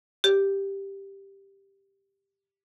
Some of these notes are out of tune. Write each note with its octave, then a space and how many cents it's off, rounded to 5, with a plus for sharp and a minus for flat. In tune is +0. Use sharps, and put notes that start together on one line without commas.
G4 +5